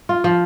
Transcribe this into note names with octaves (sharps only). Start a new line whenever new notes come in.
F4
F3